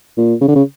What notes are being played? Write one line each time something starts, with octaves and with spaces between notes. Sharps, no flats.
A#2
C#3
D3
C#3